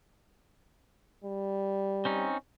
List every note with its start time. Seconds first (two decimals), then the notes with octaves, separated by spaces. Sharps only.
1.24 G3
2.05 C4 C#4 D#4